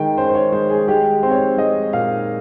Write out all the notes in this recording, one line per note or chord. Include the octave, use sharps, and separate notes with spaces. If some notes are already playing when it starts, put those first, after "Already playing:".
Already playing: D#3 G#3 G5
C#4 C5
C5
C#5
G#3 C5
G#4
G#3 G4
C4 C5
C#5
C5
G#3 D#5
A#2 F5